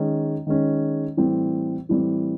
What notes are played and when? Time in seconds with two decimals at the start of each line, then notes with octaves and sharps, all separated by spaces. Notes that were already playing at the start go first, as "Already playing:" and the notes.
Already playing: D#3 G#3 C#4
0.47 D#3 G#3 C#4
1.17 A2 E3 G3 C4
1.89 A2 E3 G3 C4